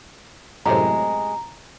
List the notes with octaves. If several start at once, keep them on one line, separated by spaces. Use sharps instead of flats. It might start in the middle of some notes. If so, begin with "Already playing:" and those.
F#2 A2 C3 G#3 A#5